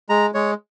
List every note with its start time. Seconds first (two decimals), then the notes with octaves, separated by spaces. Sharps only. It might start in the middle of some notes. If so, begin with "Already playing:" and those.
0.09 G#3 A#5
0.34 G#3 C#5